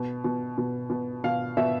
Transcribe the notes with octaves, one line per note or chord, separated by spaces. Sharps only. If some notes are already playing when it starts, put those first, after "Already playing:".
Already playing: B2
B2
B2
B2
B2 F5
B2 E5